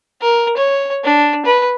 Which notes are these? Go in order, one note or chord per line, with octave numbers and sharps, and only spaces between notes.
A#4
C#5
D4
B4